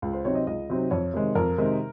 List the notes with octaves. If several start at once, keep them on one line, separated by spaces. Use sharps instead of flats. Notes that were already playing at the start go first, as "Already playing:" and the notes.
C#2
C5
C3 F#3 C4 D#4 C#5
D#5
C#2 D#5
C3 F#3 C4 D#4
F2 C#5
C3 D#3 G#3
F2 A#4
C3 D#3 G#3